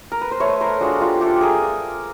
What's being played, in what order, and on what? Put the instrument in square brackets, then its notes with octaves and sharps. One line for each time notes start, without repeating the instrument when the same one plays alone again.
[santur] A#4
B4
C5
A3 B4 C#5
A#4 C5
D4 F4 F#4 G#4
F4 G4
A3 G4 A4
G#4 A#4